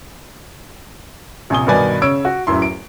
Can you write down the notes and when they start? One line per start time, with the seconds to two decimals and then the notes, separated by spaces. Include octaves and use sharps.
1.50 A#1 C3 G#5 D#6 G7
1.67 G2 B2 D#3 B4 D5 G#5
2.02 C#3 C#5 E6 D7
2.25 F#4
2.47 D1 F#2 E4 C6
2.62 D7